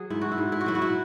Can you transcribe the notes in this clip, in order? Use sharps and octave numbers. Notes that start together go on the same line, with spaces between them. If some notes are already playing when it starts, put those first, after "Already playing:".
Already playing: F#3 G#4
G#2 E4
F#4
E4
G#2
E4
F#4
F#3 E4
F#4
E4